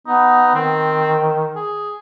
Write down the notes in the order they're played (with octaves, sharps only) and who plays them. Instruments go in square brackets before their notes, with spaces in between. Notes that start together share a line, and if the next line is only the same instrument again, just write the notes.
[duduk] B3 [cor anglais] D#4
[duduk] D#3 [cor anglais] C4
[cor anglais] G#4